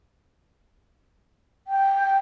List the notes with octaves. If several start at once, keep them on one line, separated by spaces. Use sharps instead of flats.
G5